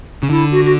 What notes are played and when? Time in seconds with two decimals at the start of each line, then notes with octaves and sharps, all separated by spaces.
0.23 C#3
0.29 D3 E4
0.51 F#4
0.64 F#4